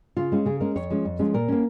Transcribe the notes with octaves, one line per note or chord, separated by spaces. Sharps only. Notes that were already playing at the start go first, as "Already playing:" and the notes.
C#3 F4
G#3 C#4
C#3 G#4
G#3 C#4 A#4
F2 C#5
F3 G#3 C#4
F2
F3 G#3 C#4
A#2 A#4
A#3 C#4